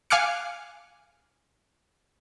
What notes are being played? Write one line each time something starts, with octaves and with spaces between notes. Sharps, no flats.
F5 G#5 D6 F6 F#6 C#7